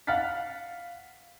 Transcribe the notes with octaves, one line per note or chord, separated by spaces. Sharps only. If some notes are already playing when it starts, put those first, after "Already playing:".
F5 F#5 F6 A6 B6